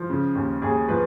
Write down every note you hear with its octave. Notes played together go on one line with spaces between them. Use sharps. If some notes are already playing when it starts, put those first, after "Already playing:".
Already playing: F3
C#3
D#2
D#2 G#4
F3 B4